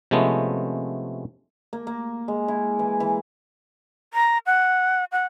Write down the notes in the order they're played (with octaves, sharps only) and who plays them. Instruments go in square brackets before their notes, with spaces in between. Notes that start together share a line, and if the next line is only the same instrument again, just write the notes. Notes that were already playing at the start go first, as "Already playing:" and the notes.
[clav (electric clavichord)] C3 F3 G#3 A3 B3 C#4
[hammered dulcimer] A#3
A#3
G#3
E4
E3
E3
[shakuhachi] A#5
F#5
F#5